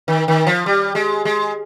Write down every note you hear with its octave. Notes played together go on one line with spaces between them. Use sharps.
D#3
D#3
F3
G3
G#3
G#3